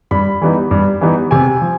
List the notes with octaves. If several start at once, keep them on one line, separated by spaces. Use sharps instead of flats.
G2 B5
E3 G3 B3 D#4
G2
E3 G3 B3 D#4
C3 G#5
F3